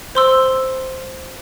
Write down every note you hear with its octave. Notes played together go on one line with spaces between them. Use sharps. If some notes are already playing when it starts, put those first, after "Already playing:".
C5 C6 E6